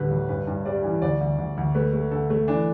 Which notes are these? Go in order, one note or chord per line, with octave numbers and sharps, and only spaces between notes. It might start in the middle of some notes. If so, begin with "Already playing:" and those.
Already playing: D2 A2 D3 G3 G4 B4
D2
G2 B4
G2
G3 D5
E3
D2 D5
D2
D2
D2
A3 B4
A3
D3 A4
A3
E3 D4